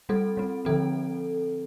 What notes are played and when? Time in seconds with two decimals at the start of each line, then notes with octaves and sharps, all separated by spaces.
0.09 G3 C4 A4
0.37 G3 C4
0.65 D3 F3 C4 A4